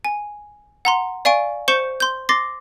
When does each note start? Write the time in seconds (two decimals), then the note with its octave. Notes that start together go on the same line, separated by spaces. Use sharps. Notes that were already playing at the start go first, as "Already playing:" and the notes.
0.05 G#5
0.85 F#5 A#5 C6
1.25 D5 F5 G#5 C#6 D7
1.68 C5 C#6 G6 C#7 E7 G7
2.00 C6 G6
2.29 C6 D6 A6 A#6 C7